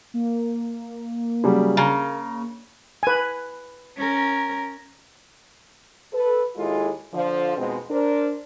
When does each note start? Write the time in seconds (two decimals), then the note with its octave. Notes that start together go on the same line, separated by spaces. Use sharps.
0.14 A#3
1.44 C#3 F#3 G3
1.77 C#3 F5 A#5
3.03 B4 G#5
3.97 C#4 A#4
6.13 A4 B4
6.56 D#2 G#3 E4 F4 G#4 A4
7.14 D3 F3
7.57 F2 G#2 B2 G#3 C4
7.90 D4 A#4 C5